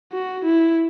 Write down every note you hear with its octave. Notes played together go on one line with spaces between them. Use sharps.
F#4
E4